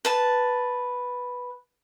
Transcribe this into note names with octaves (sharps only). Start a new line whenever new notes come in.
B4 A5